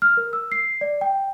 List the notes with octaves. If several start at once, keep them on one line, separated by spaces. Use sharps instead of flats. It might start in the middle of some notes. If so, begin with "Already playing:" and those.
F6
A#4
E6
C7
D5
G5